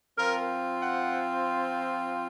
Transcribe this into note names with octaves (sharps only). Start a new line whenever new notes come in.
F3 C4 F4 A#4
F#5